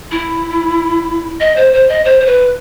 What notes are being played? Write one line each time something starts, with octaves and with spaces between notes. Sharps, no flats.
E4
D#5
C5
C5
D#5
C5
C5
B4